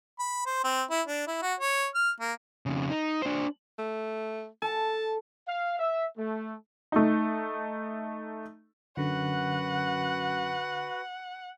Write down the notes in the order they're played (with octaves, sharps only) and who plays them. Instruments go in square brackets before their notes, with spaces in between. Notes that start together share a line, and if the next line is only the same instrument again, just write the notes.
[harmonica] B5
C5
C4
E4
D4
E4
F#4
C#5
F6
A#3
[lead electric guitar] F2 C#3
D#4
D4 C5
[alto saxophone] A3
[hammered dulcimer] A4 [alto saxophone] A5
[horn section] F5
E5
A3
[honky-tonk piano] A3 D#4
[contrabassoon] F#2 [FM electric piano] D3 [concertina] F#4 B4 [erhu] F#5